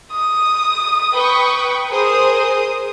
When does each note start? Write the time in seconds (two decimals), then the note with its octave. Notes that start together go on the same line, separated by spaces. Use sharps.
0.12 D#6
1.14 B4 G5 C#6
1.90 G#4 A#4 C5 D#6